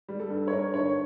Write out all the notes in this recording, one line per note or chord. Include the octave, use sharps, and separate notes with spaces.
G3
A4
G2
C#5
G2 A#4
D3 C#5